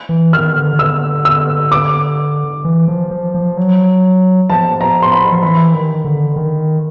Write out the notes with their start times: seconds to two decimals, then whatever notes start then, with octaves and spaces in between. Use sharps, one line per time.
0.09 E3
0.33 D#3 F6
0.56 D3
0.79 E6
1.25 E6
1.72 D6
2.65 E3
2.88 F3
3.11 F3
3.35 F3
3.57 F#3
4.50 F3 A5
4.81 A#5
5.02 C6
5.12 B5
5.32 F3
5.43 E3 B5
5.73 D#3
6.05 D3
6.36 D#3